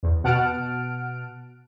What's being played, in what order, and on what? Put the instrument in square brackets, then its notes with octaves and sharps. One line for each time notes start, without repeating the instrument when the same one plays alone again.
[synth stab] E2
B2 F#5 A5 F6 D7